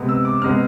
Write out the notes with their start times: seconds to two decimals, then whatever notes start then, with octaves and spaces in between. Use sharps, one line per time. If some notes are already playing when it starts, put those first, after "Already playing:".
Already playing: C3 G#3 B3
0.09 E6
0.25 D6
0.42 C3 G#3 B3 F6